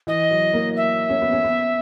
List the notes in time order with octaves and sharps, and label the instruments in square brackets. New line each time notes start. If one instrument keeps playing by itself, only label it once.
[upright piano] E3 [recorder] D#5
[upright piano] F#3
A#3
[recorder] E5
[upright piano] C#4
B3
C#4
B3